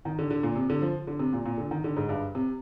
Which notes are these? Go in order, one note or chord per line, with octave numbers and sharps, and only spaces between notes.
D#3
D3
D3
A#2
C3
D3
F3
D3
C3
A#2
A#2
D3
D#3
D3
G#2
G2
C3